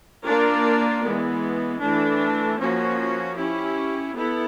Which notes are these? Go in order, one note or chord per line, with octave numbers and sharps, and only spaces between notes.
A#3 D4 F4 A#4 D5
E3 G#3 B3
E3 A3 D4
F3 A#3 C#4 F#4
C#4 E4 G4
B3 E4 A4